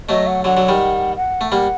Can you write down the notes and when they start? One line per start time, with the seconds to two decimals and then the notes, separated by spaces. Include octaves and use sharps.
0.09 F#3 A3 D#5
0.27 F#5
0.44 D3 F#3 F#5
0.57 D3 F#3
0.69 D#3 G3
1.17 F#5
1.41 A3
1.52 G3 A#3 F#5